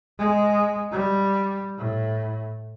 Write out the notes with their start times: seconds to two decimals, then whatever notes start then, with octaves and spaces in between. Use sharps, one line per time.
0.19 G#3
0.92 G3
1.78 A2